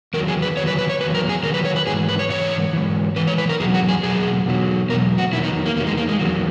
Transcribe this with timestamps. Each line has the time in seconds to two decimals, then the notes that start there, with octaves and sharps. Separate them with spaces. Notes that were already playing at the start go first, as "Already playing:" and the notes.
0.14 E2 D#3 F#3 A#4
0.28 G#4
0.42 B4
0.57 E2 D#3 F#3 C#5
0.67 B4
0.78 B4
0.89 C#5
1.01 E2 D#3 F#3 B4
1.15 A#4
1.29 G#4
1.43 E2 D#3 F#3 A#4
1.54 B4
1.65 C#5
1.76 B4
1.87 G#2 E3 G#4
2.09 B4
2.19 C#5
2.30 G#2 E3 C#5
2.73 G#2 E3
3.16 G#2 E3 B4
3.27 C#5
3.38 B4
3.49 A#4
3.60 E2 B2 F#3 G#4
3.74 F#4
3.89 G#4
4.03 E2 B2 F#3 G#4
4.46 E2 B2 F#3
4.89 E2 B2 F#3 A#4
5.18 F#4
5.33 E2 D#3 F#3 E4
5.44 D#4
5.66 A#3
5.76 E2 D#3 F#3 A#3
5.87 G#3
5.97 A#3
6.09 G#3
6.19 E2 D#3 F#3